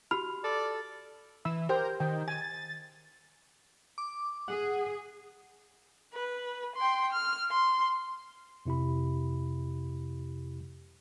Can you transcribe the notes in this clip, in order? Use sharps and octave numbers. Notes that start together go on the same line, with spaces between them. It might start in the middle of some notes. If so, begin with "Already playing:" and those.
F#4 G4 B5 F6
A4 D5
E3 E6
G4 A#4 C5 G5
D#3 G5
G#5 A6
D6
G#4 F#5
B4
G5 C6
F6
C6
F2 C3 E4 G4 B5